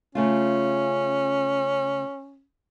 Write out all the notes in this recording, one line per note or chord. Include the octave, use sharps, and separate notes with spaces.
C#3 A3 C#4 F4